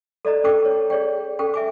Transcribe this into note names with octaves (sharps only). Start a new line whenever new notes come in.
A4 D5 D#5 A#5
C#4 A4 G5 D6
C#5
G#4 C#5 D5 G5
C#4 A4 G5
E5 G#5 D6